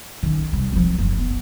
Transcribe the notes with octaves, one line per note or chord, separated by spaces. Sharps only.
D#3 C#4
C2
F3 C4
F#1
B3